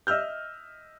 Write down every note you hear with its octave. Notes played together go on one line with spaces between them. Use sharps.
D#5 E5 E6 F6 G6